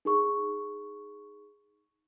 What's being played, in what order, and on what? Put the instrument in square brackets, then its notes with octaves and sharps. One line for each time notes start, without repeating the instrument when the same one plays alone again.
[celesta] D#4 G#4 C#6